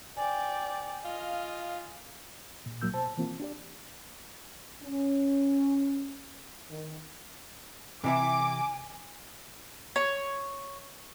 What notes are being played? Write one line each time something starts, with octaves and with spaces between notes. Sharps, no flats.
D5 G5 G#5
F4 D#5 F5
A#2
C2 A#2 F#3 A#3 E6 G6
B2 C5 A5
E3 A#3 C4 F4
D4 G4 D5
C#4
D#3
C3 E3 E4 G#5 D6
C#5